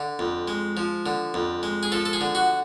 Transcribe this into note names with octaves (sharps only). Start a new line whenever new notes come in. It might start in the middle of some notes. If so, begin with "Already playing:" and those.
Already playing: D3
F2
G#3
F3
D3
F2
G#3
G#4
F3 A4
A4
G#4
D3
F#4